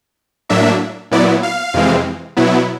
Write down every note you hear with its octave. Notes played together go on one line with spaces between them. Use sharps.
A2 F#3 A#3 D4 E5
A#2 F#3 B3 E4 D5
F5
F2 C3 E3 G#3 C4
B2 F#3 B3 E4